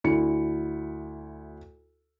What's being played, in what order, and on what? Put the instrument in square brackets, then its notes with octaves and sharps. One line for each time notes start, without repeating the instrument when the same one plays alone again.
[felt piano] D2 E4 C#7